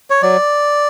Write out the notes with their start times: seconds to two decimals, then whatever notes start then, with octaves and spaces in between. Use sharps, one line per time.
0.10 C#5
0.22 F#3 D5